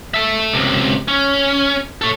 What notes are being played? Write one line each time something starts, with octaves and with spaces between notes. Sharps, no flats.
A4 E5
C#2 C3
C#4
A4 C#5